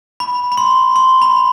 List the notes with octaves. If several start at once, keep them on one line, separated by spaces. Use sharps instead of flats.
B5
B5
C6
C6
B5